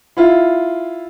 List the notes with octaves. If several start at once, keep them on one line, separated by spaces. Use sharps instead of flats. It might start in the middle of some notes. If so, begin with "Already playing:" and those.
E4 F4